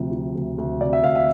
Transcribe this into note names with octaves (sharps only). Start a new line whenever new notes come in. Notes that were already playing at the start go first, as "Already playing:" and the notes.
Already playing: D2 C3 F3
F3
D2
D2
C3 D5
E5
D2 F5
E5